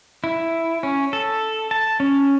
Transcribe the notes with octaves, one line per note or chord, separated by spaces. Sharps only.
E4
C#4
A4
A5
C#4